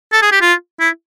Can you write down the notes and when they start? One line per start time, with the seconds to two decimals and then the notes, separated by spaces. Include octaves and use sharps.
0.12 A4
0.22 G#4
0.32 G4
0.41 F4
0.80 E4